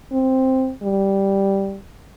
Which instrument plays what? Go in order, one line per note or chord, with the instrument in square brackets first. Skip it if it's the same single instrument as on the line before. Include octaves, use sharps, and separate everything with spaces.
[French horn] C4
G3